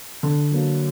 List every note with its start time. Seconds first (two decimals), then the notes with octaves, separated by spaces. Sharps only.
0.23 D3
0.51 F#3 A#3